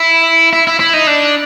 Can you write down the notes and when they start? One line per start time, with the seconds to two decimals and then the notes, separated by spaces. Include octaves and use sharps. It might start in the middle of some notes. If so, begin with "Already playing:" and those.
Already playing: E4
0.53 E4
0.67 E4
0.80 E4
0.94 D#4
1.07 D4